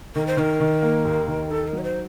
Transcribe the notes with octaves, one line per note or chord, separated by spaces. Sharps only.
D#3 A#4
C5
D#3 A#4
D#3
A#3
D#2
D#3
D#4 A4
A#4
F#3
C#5
C5